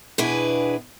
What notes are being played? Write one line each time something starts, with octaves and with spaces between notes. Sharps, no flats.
E2 B2 D4 E4 G#4 B4